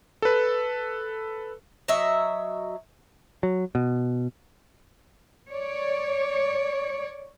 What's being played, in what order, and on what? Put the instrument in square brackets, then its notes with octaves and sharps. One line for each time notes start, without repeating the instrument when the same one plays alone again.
[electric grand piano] A4 B4
[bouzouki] F#3 D#5 E5
[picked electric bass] F#3
B2
[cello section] C#5 D5